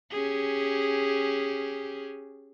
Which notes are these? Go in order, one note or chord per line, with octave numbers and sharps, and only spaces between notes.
C#4 G4 G#4